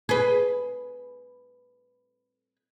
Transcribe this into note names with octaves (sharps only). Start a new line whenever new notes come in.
G#4 B4